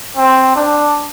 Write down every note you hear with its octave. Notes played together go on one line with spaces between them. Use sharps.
C4
D4